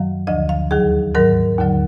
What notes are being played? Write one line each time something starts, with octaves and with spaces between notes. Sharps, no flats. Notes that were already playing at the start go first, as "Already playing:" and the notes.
Already playing: F#2 D#3 F#3 F5
D2 D3 F3 D#5
F5
D#2 D#3 F#3 G#4
G#2 D#3 F#3 A#4
D#2 D3 F#3